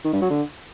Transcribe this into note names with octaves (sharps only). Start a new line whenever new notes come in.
D#3
G2
F#3
D3